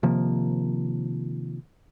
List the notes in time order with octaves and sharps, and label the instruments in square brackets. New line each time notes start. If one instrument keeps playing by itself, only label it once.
[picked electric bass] C3 D#3 F3 A#3